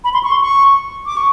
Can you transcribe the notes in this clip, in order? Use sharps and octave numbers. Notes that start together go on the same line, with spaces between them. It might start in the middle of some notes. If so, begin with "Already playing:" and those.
B5
C6
C#6
C6
C#6
D6
C#6